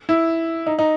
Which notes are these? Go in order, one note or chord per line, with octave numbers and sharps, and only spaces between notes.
E4
D#4
D#4